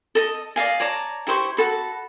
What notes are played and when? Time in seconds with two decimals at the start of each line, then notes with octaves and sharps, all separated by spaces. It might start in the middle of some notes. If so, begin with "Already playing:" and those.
0.15 A4 D#5
0.56 D5 D#5 F5 G#5
0.80 C#5 D5 A5 A#5
1.27 E4 G4 C5 C#6
1.57 F#4 A4 B5